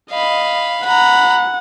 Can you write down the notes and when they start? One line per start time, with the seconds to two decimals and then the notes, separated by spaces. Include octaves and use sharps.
0.10 D#5 F5 B5
0.85 F#5 A#5 B5